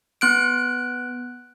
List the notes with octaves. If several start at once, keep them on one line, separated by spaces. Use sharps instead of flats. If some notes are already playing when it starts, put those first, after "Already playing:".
B3 F#6 D7